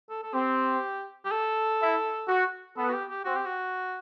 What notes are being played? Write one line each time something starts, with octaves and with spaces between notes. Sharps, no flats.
A4
A4
C4 G4
G4
A4
E4
F#4
B3 A4
F#4
G4
G4
C4 F#4
G4
F#4